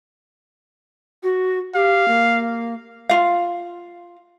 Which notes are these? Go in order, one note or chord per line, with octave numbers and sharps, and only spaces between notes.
F#4
G4 F5
A#3
F4 F5